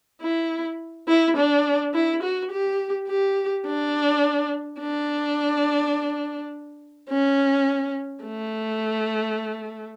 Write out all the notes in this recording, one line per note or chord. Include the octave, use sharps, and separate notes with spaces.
E4
E4
D4
E4
F#4
G4
G4
D4
D4
C#4
A3